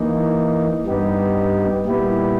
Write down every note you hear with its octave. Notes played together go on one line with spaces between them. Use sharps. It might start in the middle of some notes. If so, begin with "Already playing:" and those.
Already playing: E3 A#3 D#4
G2 G3 B3 D#4 G4
A#2 G3 B3 E4 G4